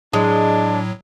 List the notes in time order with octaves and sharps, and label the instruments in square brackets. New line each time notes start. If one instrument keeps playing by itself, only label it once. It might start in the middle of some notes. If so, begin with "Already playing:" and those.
[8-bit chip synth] A2 F#3 [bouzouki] G#3 [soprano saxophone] D4